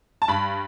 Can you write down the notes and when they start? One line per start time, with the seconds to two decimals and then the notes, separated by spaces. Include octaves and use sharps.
0.22 A5
0.28 G2 B5